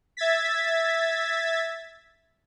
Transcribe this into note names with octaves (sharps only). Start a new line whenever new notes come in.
E5 G#6 A6 B6